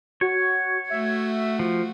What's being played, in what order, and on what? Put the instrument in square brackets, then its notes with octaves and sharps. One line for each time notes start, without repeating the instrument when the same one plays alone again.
[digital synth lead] F#4 [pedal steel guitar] C#5
[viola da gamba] A3 F#4 [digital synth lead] E5
[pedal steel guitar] F3